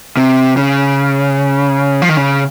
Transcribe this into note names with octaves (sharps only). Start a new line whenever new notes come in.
C3
C#3
F3
D#3
C#3